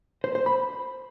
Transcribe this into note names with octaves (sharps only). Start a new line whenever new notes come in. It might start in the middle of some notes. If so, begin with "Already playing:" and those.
C5
C5
B5